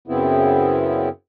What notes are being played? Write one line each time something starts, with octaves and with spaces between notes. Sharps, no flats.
F#2 C#3 B3 C4 E4